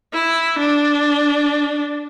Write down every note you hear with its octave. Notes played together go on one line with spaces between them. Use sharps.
E4
D4